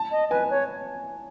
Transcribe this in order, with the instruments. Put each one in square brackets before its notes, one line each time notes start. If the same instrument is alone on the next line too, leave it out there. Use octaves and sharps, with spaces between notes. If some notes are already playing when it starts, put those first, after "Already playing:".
Already playing: [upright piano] A5
[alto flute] D#5
[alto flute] B4 [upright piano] G#5
[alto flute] C#5